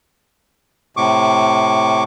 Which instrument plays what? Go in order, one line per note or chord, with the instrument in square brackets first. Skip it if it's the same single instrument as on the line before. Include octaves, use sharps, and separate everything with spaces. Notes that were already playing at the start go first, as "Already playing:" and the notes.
[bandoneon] A2 C3 C#6 D6